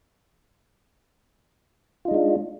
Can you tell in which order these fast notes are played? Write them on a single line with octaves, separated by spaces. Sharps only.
F4 D#4 G#3 D4